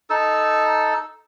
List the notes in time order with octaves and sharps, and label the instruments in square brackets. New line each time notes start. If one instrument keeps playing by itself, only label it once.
[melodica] D#4 A4 E6